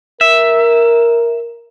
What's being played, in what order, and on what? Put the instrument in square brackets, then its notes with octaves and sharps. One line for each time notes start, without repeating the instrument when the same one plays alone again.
[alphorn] A#4 [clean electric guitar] E5